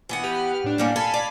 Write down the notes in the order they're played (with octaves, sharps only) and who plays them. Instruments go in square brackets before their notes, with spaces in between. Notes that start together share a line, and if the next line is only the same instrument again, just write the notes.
[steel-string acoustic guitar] E3 B3 F#5
[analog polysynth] G4 B4 F6
A2 D4
[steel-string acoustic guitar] G3 A#3 C#4
[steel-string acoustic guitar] A4 [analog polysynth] F5 G#5 B5
[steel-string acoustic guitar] D5